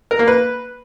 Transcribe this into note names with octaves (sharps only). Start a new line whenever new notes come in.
A#4
A#3
B4